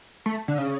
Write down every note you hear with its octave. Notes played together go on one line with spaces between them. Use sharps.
A3
D3
C#3